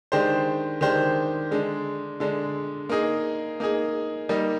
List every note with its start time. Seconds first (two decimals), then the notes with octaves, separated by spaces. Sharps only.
0.12 D#3 G#3 D4 G4 C5
0.81 D#3 G#3 D4 G4 C5
1.51 D3 G#3 D4
2.20 D3 G#3 D4
2.89 A#3 D#4 G#4
3.60 A#3 D#4 G#4
4.29 G3 A#3 D#4